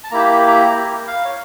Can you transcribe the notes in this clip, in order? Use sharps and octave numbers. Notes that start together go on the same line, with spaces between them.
A5
A#3 E4 G4 A#5
A#5
F5
C#5